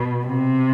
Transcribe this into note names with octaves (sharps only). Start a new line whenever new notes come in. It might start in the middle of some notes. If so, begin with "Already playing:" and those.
Already playing: B2
C3